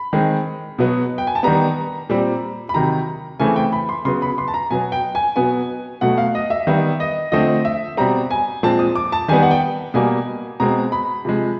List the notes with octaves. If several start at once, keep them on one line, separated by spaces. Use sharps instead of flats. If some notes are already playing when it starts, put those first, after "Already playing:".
Already playing: B5
D#3 G#3 C4
B2 F#3 B3
G5
G#5
A5
D#3 G3 B3 A#5
A#2 G3 C4
B5
C3 D#3 F#3 A#5
C#3 E3 A3 C4 G#5
G5
B5
C6
C#3 F#3 B3 C6
B5
C6
A5
A#5
B2 F#3 B3 G#5
G5
G#5
B2 F#3 B3 G#5
B2 F#3 A3 F#5
F5
D#5
E5
D#3 G3 B3 E5
D#5
D3 F3 A3 C4 D#5
E5
B2 G3 C4 A#5
G#5
A#2 F3 G#3 C4 A5
D#6
D6
A5
D#3 G3 B3 G#5
F#5
G5
B2 G3 A#3 G#5
B2 G#3 C4 A#5
B5
C3 F3 G#3